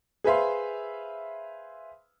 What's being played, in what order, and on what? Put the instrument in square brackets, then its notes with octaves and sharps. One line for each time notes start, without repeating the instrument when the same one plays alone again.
[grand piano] G#4 B4 C5 E5 F5 C6